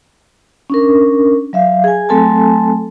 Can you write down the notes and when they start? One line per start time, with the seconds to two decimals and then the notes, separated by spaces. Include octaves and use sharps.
0.70 C#4 D4 A#4
1.53 F#3 E5 F5
1.84 G#4 G#5
2.09 F#3 A3 C4 A4 G#5 A5